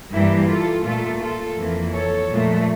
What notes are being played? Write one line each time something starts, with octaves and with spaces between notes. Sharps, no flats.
G2 E3 G3 A#3 E4 G4
F4 A4
A#2 A3 F4 A4
F4 A4
F2 E3 A#3
A4 C#5
A#2 F3 A3